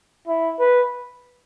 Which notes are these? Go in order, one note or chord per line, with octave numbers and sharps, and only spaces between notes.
E4
B4